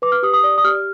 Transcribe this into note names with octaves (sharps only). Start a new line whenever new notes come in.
B4 D6
F6
G4 D#6
D#6
D5 D#6
D#6
G4 F6